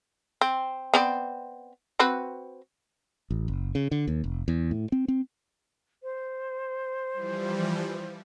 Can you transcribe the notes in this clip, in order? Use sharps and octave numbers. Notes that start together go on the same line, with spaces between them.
C4
B3 C4 D5
C4 F#4 B4
A1
F#1
C#3
D3
D#2
F1
E2
A2
C4
C4
C5
E3 F3 G3